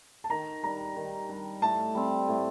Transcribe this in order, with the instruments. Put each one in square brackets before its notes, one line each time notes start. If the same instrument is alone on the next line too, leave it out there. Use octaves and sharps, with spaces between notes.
[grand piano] A5
[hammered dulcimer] D#3 [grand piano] A#5
[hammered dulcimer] G3 D4 [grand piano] A#5
[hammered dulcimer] D#3
G3 D4
[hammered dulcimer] A2 [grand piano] A5
[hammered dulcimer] G3 C4
A2